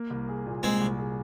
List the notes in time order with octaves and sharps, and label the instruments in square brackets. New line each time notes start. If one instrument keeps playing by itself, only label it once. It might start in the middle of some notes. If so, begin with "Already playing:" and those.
Already playing: [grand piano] A#3
C2
G#4
A#2
[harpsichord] G#3 C4 [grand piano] A#3
[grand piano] C2
G#4